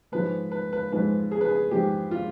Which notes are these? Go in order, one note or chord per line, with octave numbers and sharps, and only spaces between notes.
G#2 F3 G#3 B4
B4
B4
G#2 F3 G#3 B4
G#4
B4
G#4
G#2 F3 G#3 G4
F4